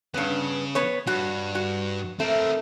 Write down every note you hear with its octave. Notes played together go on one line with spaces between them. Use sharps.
G2 C#3 B3
B3 C#5
G2 F#4
F#4
A3 C4 A#4